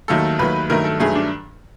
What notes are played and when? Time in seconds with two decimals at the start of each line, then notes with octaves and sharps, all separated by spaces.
0.08 D#2 D#3 F#3 A3 A4
0.39 D#2 D#3 F#3 A3 B4
0.70 G2 D#3 F#3 A3 A#4
0.84 A4
1.00 G2 D#3 F#3 A3 G#4
1.15 D4